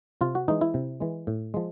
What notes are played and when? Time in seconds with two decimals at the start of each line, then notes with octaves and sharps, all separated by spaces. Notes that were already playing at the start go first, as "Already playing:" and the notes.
0.21 C3 F4
0.35 F#4
0.48 E3 G#3 D#4
0.61 E4
0.74 C3
1.00 E3 G#3
1.27 A2
1.54 F3 G#3